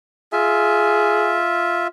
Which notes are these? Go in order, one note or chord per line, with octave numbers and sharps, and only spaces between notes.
F4 G#4 E5